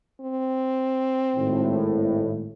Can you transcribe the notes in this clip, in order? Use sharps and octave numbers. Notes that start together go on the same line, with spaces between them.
C4
G#1 A2